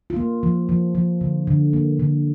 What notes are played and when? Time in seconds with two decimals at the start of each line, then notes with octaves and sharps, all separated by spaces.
0.10 F4
0.16 A#3
0.43 F3
0.69 F3
0.95 F3
1.21 D3
1.47 D3
1.73 A#3
2.00 D3